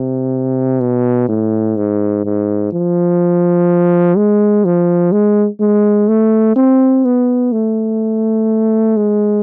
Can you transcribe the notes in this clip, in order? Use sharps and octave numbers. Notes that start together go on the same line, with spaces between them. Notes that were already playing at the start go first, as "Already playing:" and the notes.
Already playing: C3
B2
A2
G#2
G#2
F3
G#3
F3
G#3
G#3
A3
C4
B3
A3
G#3